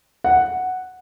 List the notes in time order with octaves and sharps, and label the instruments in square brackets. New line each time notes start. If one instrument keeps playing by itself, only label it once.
[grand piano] F#5